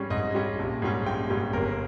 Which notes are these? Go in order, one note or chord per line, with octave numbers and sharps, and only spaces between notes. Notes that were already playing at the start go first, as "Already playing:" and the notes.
Already playing: G#2 G3 C#4
G#2 D#5
G3 C#4
A#1
G#2 G3 C#4
A#1 G5
G#2 G3 C#4
G1 A#4